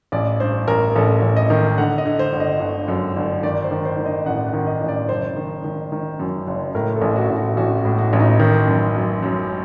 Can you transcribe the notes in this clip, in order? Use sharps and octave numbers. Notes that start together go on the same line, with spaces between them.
A1 D5
G2 C5
A1 A#4
A1 A4
A1
D#5
D#3
D3 F#5
D#5
D3
C5
G1
D#5
G1
F#2
G1
D#3 D5
C5
D#3
C5
D#3
D#5
A1 F#5
F#5
D#3
D#5
A1
D5
F#1 C5
D#3
D#3
D#3
F#2
F#1
A2 A#4
A4
A1
F#4
A1
F#4
A1 F#4
F#4
A2
F#4
A1
D#4
D#3
F#2
F#2
F#2